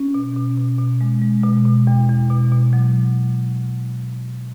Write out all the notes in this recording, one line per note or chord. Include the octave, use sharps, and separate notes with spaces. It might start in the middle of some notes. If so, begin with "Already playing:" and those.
Already playing: C#4
B2
B2
B2
B2
G#3
G#3
B2
B2
E2
E2
B2
B2
F#3